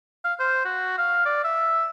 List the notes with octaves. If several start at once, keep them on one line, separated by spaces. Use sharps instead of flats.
F5
C5
F#4
F5
D5
E5